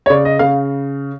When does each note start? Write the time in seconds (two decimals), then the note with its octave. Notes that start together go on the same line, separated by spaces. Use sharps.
0.06 C#5
0.10 C#3 D5
0.25 D#5
0.39 C#3 F5